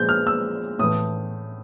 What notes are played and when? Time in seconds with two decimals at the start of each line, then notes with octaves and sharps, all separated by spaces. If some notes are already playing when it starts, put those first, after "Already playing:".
Already playing: A#2 F3 G#3 G6
0.09 F6
0.27 E6
0.79 A2 E3 A3 D#6